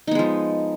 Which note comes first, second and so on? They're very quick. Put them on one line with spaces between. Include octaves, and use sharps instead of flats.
D#4 B3 G#3 F3